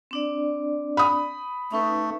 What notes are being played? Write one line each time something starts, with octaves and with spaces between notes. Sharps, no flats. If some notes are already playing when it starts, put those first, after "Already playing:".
C4 D4 D5
B5 D#6
A3 C#4 D#4 B4